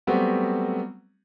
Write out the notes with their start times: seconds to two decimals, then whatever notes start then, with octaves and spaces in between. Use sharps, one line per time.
0.07 F#3 G3 A3 B3 C4 F#4